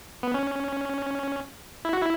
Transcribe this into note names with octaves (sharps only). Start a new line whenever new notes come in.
B3
C#4
E4
F#4
E4